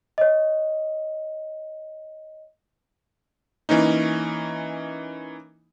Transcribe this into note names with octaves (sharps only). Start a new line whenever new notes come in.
C#5 D#5
E3 A#3 C#4 D#4